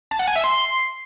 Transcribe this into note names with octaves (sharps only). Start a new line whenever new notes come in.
A5
F#5
G#5
E5
C6